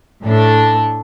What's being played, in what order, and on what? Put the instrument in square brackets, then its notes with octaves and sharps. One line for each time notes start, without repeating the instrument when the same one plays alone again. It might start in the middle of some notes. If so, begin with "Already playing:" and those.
[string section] A2 D4 A4